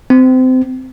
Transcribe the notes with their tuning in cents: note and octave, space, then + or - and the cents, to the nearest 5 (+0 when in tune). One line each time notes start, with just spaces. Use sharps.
C4 -25